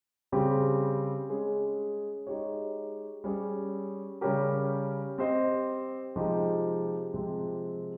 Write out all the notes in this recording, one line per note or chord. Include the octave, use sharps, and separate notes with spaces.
C#3 G3 C4 G4
G#3 C#4 G#4
G#3 D#4 G4 C#5
G3 C#4 G#4 C#5
C#3 G3 C#4 G4 A#4
C4 G4 C5 D#5
C3 F3 G#3 D#4 G4
C3 F3 G#3 C4